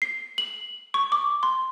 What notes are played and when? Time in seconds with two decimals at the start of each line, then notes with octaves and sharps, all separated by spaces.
0.02 C7
0.38 F#7
0.94 C#6
1.12 D6
1.43 C6